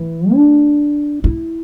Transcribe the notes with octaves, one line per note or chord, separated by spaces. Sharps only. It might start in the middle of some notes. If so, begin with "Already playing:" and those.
Already playing: E3
D4
E4